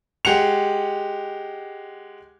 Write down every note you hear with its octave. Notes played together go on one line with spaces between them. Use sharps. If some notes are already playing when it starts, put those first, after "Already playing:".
G#3 G4 F#5 C#7 F7